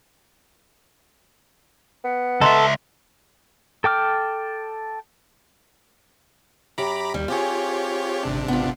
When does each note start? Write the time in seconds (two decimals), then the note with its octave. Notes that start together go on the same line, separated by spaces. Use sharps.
2.04 B3
2.41 C#2 A4 D#5 E5 A#5 C6
3.84 A4 G5 D6 F6
6.78 F#2 G4 A#5 B5 D6
7.14 D#2 G3
7.28 C4 F4 G4 G#4 C#5
8.24 G#1 C3 D4
8.48 B3 F4